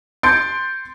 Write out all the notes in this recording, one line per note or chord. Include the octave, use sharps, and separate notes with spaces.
C6 G6 A6 C#7 D7